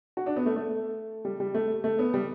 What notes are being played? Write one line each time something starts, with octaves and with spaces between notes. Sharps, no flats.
F#4
D4
B3
A3
A3
G3
G3
A3
A3
B3
G3